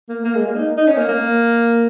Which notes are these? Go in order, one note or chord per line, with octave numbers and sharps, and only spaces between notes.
A#3
A#3
G#3
A#3
D#4
D#4
C#4
A#3
A#3